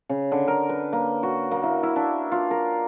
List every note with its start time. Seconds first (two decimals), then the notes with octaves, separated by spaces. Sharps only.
0.09 C#3
0.32 D3
0.48 A#4
0.69 B4
0.93 A#3
1.23 F#4
1.51 A#3
1.63 E4
1.83 E4
1.96 D4
2.32 F4
2.51 A#4